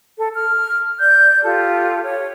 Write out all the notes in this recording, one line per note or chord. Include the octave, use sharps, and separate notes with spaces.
A4
F6
D5 G6
F4 G4 A4
C#5